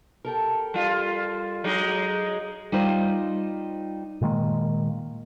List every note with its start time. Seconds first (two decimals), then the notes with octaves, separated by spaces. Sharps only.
0.25 G4 A4 A#4
0.74 G3 F4
1.64 F#3 G#3 D#4
2.72 G3 D#4 F4 C5 D#5
4.21 A#2 D#3 G#3 A#3